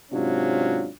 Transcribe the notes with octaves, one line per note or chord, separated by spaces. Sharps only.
G#2 C3 F#3 C#4 D4 F4